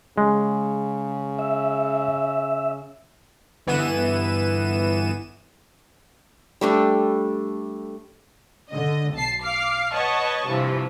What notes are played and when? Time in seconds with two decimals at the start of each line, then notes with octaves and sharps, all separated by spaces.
0.18 C#3 G#3
1.39 E5
3.67 G1 E3 B3 D#7 E7
6.61 G3 A3 D4
8.71 D3 D#5
9.14 B1 A5 C7
9.43 F5 D6 F6 C7
9.93 B4 C#5 D#5 F#5 A5 C#6
10.47 G2 C3 E3 F3